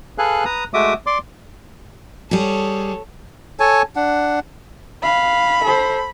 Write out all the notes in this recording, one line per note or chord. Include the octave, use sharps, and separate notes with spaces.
G#4 A4 B4 F5 G#5 F#6
B4 A#5 D#6
G#3 A3 F#4 E5 D6 D#6
D5 C6 D6
G3 G#4 A4 C#5
A4 C#5 G#5 A5
D4 F#5
F5 B5
A4 C5